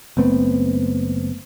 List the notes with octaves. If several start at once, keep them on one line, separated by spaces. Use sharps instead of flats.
F#1 A3 B3 C4